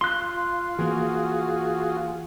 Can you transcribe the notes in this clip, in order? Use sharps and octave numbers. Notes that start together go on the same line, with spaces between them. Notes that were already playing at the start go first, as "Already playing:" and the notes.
F4 C6 F#6
E3 A#3 F4 F#4 G#4